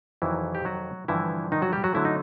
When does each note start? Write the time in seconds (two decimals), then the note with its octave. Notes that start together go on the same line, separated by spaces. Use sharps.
0.22 F2 C3 D#3 E3 F#3 A3 E4
0.55 G4
0.65 F#3 F#4
1.08 G2 D3 E3 F3 E4
1.52 D#3 D#4
1.62 F#3 F#4
1.73 G3 G4
1.84 F#3 F#4
1.94 D3 F#3 A3 E4
2.05 D#4